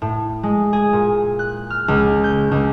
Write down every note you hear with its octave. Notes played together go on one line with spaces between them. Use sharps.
A2
G#3
G#4
A#2
F#6
F6
C#2
G6
C#2